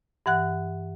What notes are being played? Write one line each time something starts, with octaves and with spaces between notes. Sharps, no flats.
G2 E3 F#5 F#6